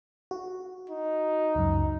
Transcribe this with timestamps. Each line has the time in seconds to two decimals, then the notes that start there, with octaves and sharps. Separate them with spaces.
0.31 F#4
0.90 D#4
1.55 C#2 F#2